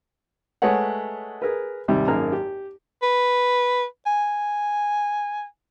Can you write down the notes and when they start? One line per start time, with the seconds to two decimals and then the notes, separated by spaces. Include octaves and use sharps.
0.62 G#3 A3 B4 C#5 F#5
1.42 G#4 A#4 B4
1.88 D#2 G#2 C3 G3
2.08 G#1 F#2 A#3 G#4 A#5 F6
2.32 G4
3.02 B4
4.06 G#5